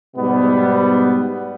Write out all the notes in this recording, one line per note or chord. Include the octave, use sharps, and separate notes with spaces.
G#2 B2 G3 B3